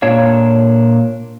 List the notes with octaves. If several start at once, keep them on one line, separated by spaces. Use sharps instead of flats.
A#2 D4 C#5 F5